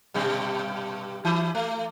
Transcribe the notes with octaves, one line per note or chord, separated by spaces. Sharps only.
G2 B2 G3
E3 E4
A3